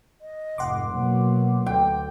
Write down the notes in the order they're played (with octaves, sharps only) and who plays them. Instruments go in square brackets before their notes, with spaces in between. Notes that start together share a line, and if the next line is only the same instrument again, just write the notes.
[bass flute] D#5
[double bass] F1 G#2 [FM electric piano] F#5 C6 D6
[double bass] B2 F#3 [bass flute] A#3
[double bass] D2 [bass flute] A4 [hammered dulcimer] G5